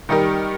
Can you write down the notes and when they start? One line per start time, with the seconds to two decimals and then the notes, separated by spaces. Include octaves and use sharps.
0.09 D#3 G3 D#4 G4 A#4